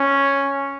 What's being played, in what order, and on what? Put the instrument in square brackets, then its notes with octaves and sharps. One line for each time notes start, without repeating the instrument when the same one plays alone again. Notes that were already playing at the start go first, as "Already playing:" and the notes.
Already playing: [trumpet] C#4